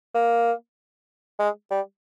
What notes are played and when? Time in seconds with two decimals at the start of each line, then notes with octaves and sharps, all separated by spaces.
0.14 A#3
1.40 G#3
1.71 G3